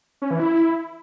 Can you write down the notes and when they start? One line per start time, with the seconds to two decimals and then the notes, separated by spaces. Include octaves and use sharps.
0.22 C#4
0.31 E3
0.40 E4